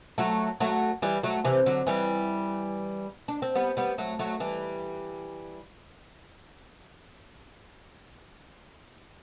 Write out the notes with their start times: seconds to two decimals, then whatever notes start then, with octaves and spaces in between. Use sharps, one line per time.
0.18 F#3 A3
0.60 F#3 A3
1.02 E3 G3
1.23 F#3 A3
1.45 C3 E3
1.66 D3 F#3
1.87 E3 G3
3.28 D4
3.42 C4
3.55 G3 B3
3.77 G3 B3
3.98 F#3 A3
4.19 F#3 A3
4.40 E3 G3